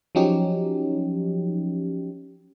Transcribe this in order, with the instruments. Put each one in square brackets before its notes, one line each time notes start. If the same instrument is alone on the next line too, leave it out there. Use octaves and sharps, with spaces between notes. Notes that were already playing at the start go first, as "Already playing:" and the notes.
[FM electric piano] F3 F#3 C#4 D#4 G4